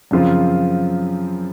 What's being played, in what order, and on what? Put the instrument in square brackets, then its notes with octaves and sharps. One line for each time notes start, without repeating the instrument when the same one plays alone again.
[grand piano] F#2 C#3 F3 C4 F4